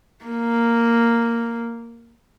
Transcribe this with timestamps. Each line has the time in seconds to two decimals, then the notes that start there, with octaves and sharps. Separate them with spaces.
0.25 A#3